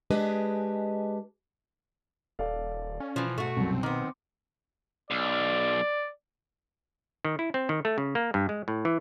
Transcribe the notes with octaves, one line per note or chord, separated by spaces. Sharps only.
G#3 D4 G4 G#4 B4 D#5
D#1 A4 D5 F5
C#4
B1 E3 F3
G#2 A3 F#4
C2 F#2 C4
D#3 B3 C6 D6
B1 D5
D#3
E4
C4
D#3
A3
C#3
A#3
G2
G#3
A2
E3